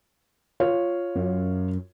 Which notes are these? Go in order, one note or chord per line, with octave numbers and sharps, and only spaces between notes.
F4 C#5
F#2